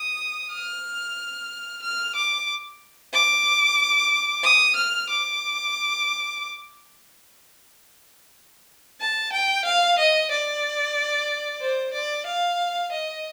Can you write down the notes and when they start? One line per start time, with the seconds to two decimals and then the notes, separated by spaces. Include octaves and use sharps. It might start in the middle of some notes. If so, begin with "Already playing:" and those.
Already playing: D#6
0.53 F6
1.83 F6
2.15 D6
3.13 D6
4.43 D#6
4.76 F6
5.10 D6
9.01 A5
9.33 G5
9.65 F5
9.99 D#5
10.31 D5
11.61 C5
11.94 D5
12.26 F5
12.92 D#5